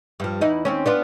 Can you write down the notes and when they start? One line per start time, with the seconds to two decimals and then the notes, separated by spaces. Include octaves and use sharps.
0.20 G2 F3
0.41 E2 D#4 E4
0.65 D#2 C4 C#4
0.86 B3 D4 F4